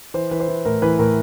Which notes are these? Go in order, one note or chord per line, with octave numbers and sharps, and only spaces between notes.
E3 C5
E3 B4
C5
E3
A2 A#4
E3 B4
A2 A#4